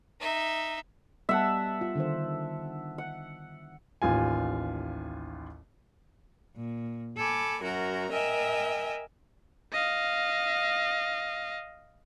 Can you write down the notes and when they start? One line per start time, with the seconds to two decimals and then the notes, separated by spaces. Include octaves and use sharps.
0.20 D#4 E5
1.29 G3 B3 E5 F#5 A5
1.81 F4
1.95 D3 D#3 C5
2.98 F#5
4.02 A1 D#2 F4 G#5
6.55 A#2
7.17 A4 G#5 B5 D6
7.62 F#2 F#4 A#4 A#5
8.11 A#4 D#5 E5 G5 G#5
9.72 D#5 F5